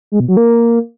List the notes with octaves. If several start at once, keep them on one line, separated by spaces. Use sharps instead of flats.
G#3
B2
F#3
A#3